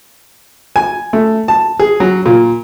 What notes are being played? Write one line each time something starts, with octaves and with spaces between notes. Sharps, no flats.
G#5
A3
A5
G#4
F#3
A#2